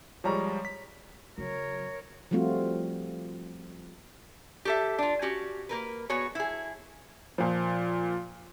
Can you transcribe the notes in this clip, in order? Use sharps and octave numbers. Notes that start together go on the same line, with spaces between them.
F3 G3 G#3 C#5 A#5 C#6
B6
C#3 F#3 A#4 C#5
F3 G3 A3 C4 F4 F#4
G4 A4 E5
D4 F4
C#4 F#4 G4
A#3 A#4 B4
B3 F#4 G#4 C#5
E4 G#4
A#2 F3